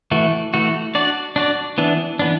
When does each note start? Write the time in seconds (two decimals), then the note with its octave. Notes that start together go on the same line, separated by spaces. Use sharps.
0.11 E3 A3 F#4
0.54 E3 A3 F#4
0.95 D4 F#4 D5
1.36 D4 F#4 D5
1.78 E3 B3 D4
2.19 E3 B3 D4